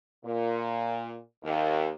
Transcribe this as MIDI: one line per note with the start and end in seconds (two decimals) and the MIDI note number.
0.24 1.16 46
1.43 1.89 39